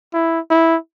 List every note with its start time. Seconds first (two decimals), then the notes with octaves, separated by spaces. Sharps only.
0.14 E4
0.50 E4